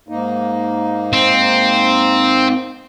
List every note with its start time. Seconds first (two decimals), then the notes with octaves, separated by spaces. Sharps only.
0.09 G#2 A#3 D#4
1.13 C4